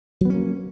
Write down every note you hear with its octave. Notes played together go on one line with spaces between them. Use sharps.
F#3 A#3 B3 C#4